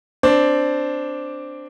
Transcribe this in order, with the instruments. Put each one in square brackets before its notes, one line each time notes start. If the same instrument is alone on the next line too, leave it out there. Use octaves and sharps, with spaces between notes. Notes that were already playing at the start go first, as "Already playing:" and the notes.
[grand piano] C4 D4